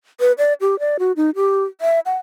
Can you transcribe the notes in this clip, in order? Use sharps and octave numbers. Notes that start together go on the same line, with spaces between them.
B4
D5
G4
D5
F#4
D#4
G4
E5
F#5